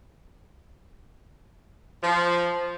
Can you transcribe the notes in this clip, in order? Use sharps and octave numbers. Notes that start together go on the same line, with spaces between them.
F3